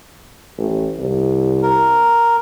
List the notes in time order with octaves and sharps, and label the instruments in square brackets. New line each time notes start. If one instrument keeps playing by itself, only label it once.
[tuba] A1
C2
[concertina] A#4